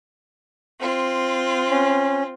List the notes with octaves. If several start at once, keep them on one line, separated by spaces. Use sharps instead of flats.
C4 F4
C#4